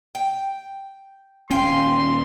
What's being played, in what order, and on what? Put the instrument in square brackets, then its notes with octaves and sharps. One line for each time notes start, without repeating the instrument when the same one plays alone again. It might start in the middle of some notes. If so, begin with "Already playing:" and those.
[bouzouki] G5
[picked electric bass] D#1 C#4 [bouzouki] F5 G5 G#5 [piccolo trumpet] C6